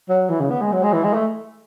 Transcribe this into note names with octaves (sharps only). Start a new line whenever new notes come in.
F#3
E3
C#3
B3
G#3
F#3
G#3
E3
G#3
A3